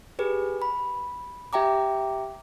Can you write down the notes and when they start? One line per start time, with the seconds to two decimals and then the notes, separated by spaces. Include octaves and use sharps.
0.19 G4 G#4 B4
0.62 B5
1.53 G4 E5 G5 A#5 D6